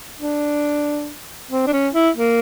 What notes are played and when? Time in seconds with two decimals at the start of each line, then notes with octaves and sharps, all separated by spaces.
0.20 D4
1.51 C4
1.67 D4
1.73 C#4
1.94 E4
2.16 A#3